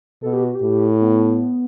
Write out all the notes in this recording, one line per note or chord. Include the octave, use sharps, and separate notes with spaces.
B2 A4
G4
F#4
G4
A2
B3